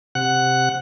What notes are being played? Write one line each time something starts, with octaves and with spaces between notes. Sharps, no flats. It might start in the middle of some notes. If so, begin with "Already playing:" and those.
C3 F#5 F#6